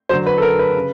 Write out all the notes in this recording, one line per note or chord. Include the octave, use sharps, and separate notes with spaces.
D3 F#3 C5
B4
A4
A#4
B4
C#3